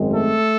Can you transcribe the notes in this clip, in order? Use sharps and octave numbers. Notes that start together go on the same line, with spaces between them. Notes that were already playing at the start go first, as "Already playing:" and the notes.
Already playing: G#1 F#2 D#3 G#3 C4
A3 A4